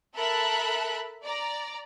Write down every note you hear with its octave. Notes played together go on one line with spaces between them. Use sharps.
A4 A#4 E5 A5 B5 F#6
D5 A#5